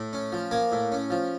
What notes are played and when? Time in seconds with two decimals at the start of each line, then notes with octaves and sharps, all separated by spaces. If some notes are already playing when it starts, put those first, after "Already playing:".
Already playing: A2
0.13 C#4
0.32 F3
0.51 A#3 G#5
0.72 A2
0.92 C#4
1.10 F3